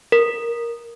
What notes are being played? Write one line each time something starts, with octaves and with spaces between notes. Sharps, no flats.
A#4